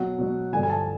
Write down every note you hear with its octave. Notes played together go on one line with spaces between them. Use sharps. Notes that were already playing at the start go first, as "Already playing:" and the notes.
Already playing: B2 F#3 F#5
B2 F#3
G2 D3 F3 G#5
G#5
A5